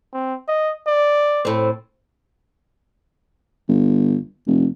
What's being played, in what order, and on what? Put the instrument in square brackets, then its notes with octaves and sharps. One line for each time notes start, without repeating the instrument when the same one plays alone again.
[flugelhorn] C4
D#5
D5
[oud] A2 C4
[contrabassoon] G1
F1